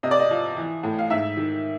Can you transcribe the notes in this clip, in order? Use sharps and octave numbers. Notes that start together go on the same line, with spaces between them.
C3 D#5
D5
D#5
F3
E3
A2
F5
G#2 E5
D#3